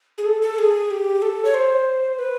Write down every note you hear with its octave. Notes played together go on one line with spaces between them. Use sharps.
G#4
A4
A4
G#4
G4
A4
C#5
C5
B4